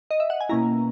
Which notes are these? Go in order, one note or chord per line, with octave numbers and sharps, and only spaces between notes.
D#5
E5
F#5
G#5
B2 A#3 C#4 E4 A#5